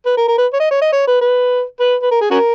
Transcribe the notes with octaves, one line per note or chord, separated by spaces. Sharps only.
B4
A#4
A#4
B4
C#5
D#5
C#5
D#5
C#5
B4
B4
B4
B4
A#4
G#4
C#4 F#4 A#4